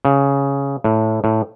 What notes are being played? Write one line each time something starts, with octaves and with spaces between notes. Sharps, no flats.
C#3
A2
A2